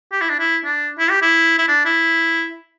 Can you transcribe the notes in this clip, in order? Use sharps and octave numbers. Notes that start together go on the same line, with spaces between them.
G4
E4
D4
E4
D4
E4
G4
E4
E4
D4
E4